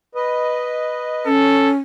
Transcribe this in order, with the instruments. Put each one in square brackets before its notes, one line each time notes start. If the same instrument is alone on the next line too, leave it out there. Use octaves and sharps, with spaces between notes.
[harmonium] B4 D#5
[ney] C#4 [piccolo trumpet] A4